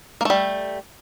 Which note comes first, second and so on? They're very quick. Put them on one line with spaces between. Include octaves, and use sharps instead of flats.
A#3 A3 G3